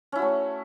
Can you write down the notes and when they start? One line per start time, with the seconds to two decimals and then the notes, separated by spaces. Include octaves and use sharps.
0.12 C#4
0.16 E4
0.19 F#4
0.22 A3